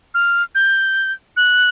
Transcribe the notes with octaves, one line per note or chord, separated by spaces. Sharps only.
F6
G6
F#6